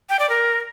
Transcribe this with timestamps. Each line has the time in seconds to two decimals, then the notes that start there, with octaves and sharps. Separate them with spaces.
0.09 G5
0.19 D5
0.29 A#4